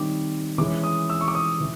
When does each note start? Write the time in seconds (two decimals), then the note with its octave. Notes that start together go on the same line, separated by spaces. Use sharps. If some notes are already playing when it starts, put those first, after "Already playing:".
Already playing: D#3 G3 C4 D#4 D6
0.58 E3 G#3 C#4 D6
0.83 D#6
1.10 E6
1.21 C#6
1.28 D6
1.35 D#6
1.61 E3